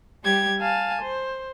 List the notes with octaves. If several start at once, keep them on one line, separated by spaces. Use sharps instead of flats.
G3 G4 G#6
F5 G#5 A5
C5